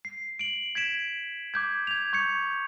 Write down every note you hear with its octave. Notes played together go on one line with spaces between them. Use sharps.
C7
D7 F#7
G#6 B6 D7 E7
D6 G6 G#6
G#6 F7
C#6 G6 G#6 C#7